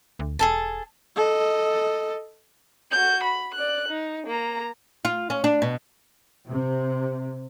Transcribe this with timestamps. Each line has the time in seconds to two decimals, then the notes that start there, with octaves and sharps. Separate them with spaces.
0.19 D2
0.39 E1 G#4 A4 A5
1.16 A4 D#5
2.91 F#4 G6
3.24 B5
3.55 D5 F#6
3.88 D#4
4.27 A#3 A#5
5.05 F4
5.30 C#4
5.44 D4
5.62 B2
6.47 C3